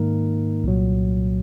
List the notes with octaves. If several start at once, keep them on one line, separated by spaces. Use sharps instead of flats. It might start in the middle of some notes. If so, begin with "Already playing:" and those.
Already playing: G#2 D#3 A#3 D#4 A#4
C2 A#2 F#3